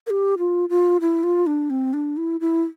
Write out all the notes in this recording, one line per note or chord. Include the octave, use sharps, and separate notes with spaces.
A#4
G4
F4
F4
E4
F4
D4
C4
D4
E4
E4